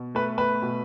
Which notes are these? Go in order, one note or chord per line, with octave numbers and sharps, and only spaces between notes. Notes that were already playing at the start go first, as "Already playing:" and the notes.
Already playing: B2
A3 B4
B4
B2